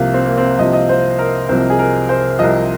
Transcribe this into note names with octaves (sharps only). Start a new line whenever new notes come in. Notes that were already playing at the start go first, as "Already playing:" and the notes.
Already playing: C2 C3 F3 A#3
C4
A#3
C4
C2 C3 F3 D#5
D#5
C5
A#4
C2 C3 F3 C5
G#4
A#4
C5
C2 C3 F3 D#5